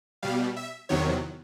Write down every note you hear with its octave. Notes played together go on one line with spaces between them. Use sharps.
B2 G3 F5
E5
E2 C3 D#3 F#3 C#5